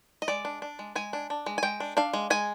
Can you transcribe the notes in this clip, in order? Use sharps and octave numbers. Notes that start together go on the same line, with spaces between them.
D#5
G#3 D5
D4
D4
G#3
G#3 G#5
D4
D4
G#3
G#5
G#3 G5
D4
D4 F5
G#3
G#3 G#5